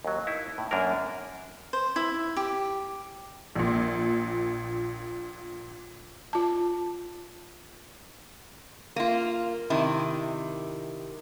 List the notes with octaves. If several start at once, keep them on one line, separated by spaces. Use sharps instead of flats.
D#2 F#3
D#4 E4
A2
F#2 A#3 D4 A#4
C5
E4
G4
A#1 A#2
F4 A5
A#3 F4
C3 D#3 E4